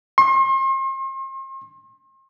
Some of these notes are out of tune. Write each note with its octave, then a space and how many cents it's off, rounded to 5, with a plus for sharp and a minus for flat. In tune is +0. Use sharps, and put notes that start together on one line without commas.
C6 +40